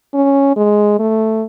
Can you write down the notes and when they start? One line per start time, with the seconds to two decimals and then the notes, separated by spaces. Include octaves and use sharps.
0.14 C#4
0.56 G#3
0.99 A3